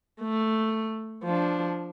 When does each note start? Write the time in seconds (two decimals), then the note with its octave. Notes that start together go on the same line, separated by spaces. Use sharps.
0.21 A3
1.24 F3 D4